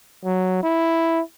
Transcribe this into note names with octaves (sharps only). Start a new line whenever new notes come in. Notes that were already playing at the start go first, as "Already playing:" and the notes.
F#3
E4